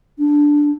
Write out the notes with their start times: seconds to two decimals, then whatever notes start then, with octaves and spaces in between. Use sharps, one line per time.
0.19 D4